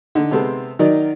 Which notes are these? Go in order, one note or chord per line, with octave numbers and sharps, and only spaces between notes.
D3 D#4
C3 G#3 B3 C4 A4
D#3 F#3 D#4 A#4 D5